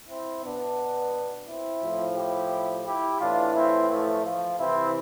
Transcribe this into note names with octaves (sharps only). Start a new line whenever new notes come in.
C4 E4
B2 B3 D4
C4 E4
A2 F3
E4 G4
E4 G4
A2 E3 D4 F4
C4 E4
F3 A3
F3
C3 E3 C4 E4